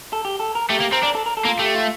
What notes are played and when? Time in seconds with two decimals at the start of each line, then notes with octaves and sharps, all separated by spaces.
0.13 A4
0.25 G4
0.40 A4
0.55 A#4
0.69 A3 G4
0.80 A#3
0.92 C4 A#4
1.03 D4
1.15 A4
1.26 A#4
1.37 A4
1.45 A#3
1.48 F4
1.59 A3 G4
1.75 F4